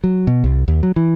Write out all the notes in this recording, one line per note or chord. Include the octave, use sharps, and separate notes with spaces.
F#3
B2
C2
D#2
F#3
E3